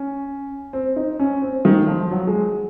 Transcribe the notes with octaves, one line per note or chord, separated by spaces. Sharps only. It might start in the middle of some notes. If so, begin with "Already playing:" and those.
Already playing: C#4
C4
D#4
C#4
C4
D#3
F3
F#3
G#3